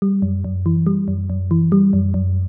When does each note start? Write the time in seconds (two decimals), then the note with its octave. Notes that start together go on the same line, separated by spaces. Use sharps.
0.02 G3
0.22 F#2
0.44 F#2
0.66 E3
0.87 G3
1.08 F#2
1.30 F#2
1.51 E3
1.72 G3
1.93 F#2
2.14 F#2